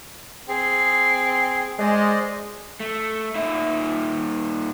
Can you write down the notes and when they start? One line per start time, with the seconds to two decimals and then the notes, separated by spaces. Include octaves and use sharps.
0.49 C4 G#4
1.79 G#3 C5 D5 D#5
2.80 A3
3.35 A#2 D#4 E5